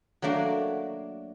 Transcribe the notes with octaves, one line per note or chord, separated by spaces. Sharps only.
F#3 A3 A#3 D4 F#4